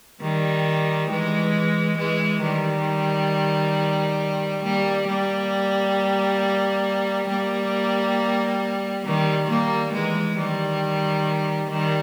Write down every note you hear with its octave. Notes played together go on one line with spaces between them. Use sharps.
D#3 G3
E3 G#3
E3 G#3
D#3 G3
G3 A#3
G3 A#3
G3 A#3
D#3 G3
G3 A#3
E3 G#3
D#3 G3
D#3 G3